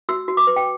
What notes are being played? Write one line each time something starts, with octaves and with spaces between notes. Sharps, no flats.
F#4 E6
F#4
D6
B4
G5